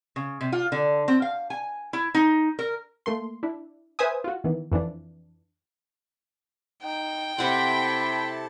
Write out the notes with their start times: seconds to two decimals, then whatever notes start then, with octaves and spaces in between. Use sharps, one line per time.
0.16 C#3
0.41 C3
0.52 F4
0.72 D3
1.08 C4
1.22 F5
1.50 G#5
1.93 E4
2.15 D#4
2.59 A#4
3.06 A3 A#3 C6
3.43 D4 E4
3.99 B4 C5 E5 G#5 D#6
4.24 F4 F#4
4.44 D#3 E3 B3
4.72 F2 E3 F3 D4
6.83 D#4 G5
7.38 C3 E4 A4 F#5 A5 B5